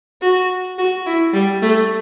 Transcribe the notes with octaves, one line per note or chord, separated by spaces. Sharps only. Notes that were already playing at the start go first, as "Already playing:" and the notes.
F#4
F#4
E4
G3
A3